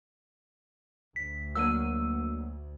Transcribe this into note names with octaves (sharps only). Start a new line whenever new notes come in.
D2 B6
F#3 A#3 D4 E6 D#7